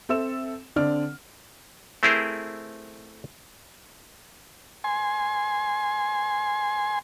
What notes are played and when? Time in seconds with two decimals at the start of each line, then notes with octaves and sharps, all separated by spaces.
0.09 C4 A4 E5 E6 E7
0.76 D3 C4 D4 D5 F6
2.03 A3 C4 E4 G#4 A#4 C5
4.84 G#5 C6